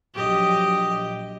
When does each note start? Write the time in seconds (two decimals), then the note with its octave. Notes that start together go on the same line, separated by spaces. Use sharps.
0.15 A#1 F#3 G4 D#5